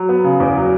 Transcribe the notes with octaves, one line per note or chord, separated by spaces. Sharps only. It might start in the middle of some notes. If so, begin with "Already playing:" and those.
Already playing: F#3
B3
C#3
E2
F#3